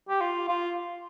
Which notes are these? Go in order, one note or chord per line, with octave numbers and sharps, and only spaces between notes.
G4
F4
F4